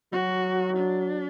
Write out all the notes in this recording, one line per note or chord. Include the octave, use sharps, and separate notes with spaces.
F#3 F#4
D4